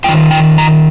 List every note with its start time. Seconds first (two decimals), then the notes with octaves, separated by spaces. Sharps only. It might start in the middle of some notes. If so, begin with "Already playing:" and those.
0.04 A#3 F4 G5
0.08 D#3
0.31 G5
0.58 A#5